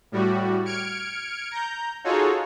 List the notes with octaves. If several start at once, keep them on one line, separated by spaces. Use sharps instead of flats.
A2 G3 F#4
F6 G#6 C#7 D7
A#5 G6
D#4 F4 F#4 G#4 A4 C#5